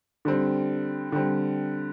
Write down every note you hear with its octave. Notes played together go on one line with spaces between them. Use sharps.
D3 G3 C4
D3 G3 C4